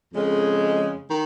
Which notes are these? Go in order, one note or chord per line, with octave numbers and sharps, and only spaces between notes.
F2 C#3 G#3
D#3